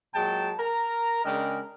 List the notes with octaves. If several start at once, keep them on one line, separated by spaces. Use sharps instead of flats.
A#2 F#3 G#3 G5 A5
A#4 A#5
C#3 G#3 D4 A#4 D#5 G5